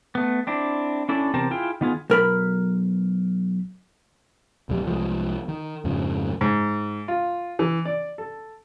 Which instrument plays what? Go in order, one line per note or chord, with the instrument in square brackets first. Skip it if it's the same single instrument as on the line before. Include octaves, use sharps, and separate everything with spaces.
[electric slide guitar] A3 B3
C4 D4 E4
C#4 D4 E4 A4
E2 C3 C4 A#4 C5 A5
E4 F4 G#4 G5
D#3 B3 F4 G#4
[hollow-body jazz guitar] B1 A#4 B5
[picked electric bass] E1 B1 F2 G3
C2 F3 G3 G#3
D#3
F2 G#2 C#3 F3
[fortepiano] G#2
F4
E3
D5
A4